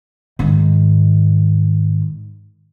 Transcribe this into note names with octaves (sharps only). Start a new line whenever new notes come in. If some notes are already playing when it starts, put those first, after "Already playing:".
G#2 D#3